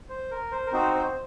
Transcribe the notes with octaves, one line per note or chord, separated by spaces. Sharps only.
C5
A#4
C5
A#4
C4 D#4 F#4 C5
C5